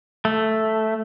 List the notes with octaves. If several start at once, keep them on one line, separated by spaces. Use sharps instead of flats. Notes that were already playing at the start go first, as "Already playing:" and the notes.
A3